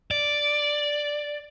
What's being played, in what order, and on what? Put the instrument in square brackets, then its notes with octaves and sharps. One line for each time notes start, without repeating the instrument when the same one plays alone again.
[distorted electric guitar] D5